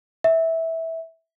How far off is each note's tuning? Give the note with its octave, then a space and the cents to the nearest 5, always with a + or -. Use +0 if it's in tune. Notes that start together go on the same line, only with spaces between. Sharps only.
E5 -15